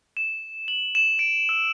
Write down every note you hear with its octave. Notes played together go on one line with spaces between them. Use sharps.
E7
F#7
E7
D7
E6